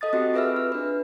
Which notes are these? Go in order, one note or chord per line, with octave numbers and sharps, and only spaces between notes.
A4 D#5 D#6 A6
C4 F#4 G4 F#5
F4 G#4 B4 E5 E6 F6
F6
D4 B4